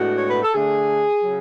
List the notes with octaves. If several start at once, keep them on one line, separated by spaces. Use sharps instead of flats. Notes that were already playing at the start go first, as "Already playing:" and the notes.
Already playing: A2 G#3 B3 D4 F#4
C#5
B4
A4
D3 A3 D4 G#4
C#3 F#3